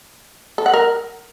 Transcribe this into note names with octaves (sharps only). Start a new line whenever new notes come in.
A4
F#5
A#4